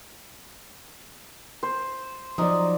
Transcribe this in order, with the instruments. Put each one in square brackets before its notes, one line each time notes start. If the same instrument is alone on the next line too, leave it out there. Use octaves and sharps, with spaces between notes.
[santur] C5
[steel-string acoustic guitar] F3 F#3 [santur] D#4 D5